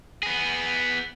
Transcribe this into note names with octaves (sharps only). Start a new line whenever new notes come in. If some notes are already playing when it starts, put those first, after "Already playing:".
B3 G#4